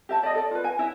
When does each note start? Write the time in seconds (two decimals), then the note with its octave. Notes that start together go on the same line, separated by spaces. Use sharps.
0.09 G4 E5 A5
0.23 D5 D#5
0.35 A4 D5
0.51 F4 B4
0.64 G#5
0.79 E4 E5